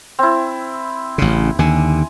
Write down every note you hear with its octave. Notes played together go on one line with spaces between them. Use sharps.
C4 E4
A1 C#3
D#2 D3 G#5